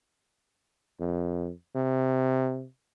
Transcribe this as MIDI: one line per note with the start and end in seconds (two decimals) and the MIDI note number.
1.00 1.51 41
1.75 2.66 48